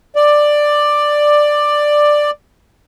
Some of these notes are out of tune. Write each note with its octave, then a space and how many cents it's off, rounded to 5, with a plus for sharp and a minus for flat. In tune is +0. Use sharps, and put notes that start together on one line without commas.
D5 +10